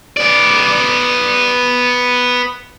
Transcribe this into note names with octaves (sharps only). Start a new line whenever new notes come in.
B3 D5